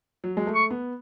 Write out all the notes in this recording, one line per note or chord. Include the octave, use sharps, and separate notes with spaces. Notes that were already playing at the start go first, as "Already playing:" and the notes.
F#3
G#3
A3
C#6
B3